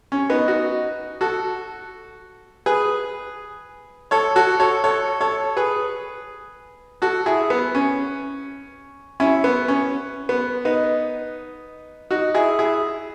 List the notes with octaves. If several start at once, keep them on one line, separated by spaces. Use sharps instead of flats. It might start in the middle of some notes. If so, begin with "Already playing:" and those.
C#4
B3 D#4
D#4 F#4
F#4 A4
G#4 B4
A4 C#5
F#4 A4
A4 C#5
A4 C#5
A4 C#5
G#4 B4
F#4 A4
E4 G#4
B3
C#4
C#4 E4
B3
C#4
B3
B3 D#4
D#4 F#4
E4 G#4
E4 G#4